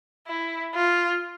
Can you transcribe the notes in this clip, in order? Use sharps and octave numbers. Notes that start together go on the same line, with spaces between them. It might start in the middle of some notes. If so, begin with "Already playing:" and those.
E4
F4